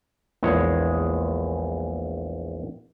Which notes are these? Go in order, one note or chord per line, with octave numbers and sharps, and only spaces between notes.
A#1 E2 G#3 C#5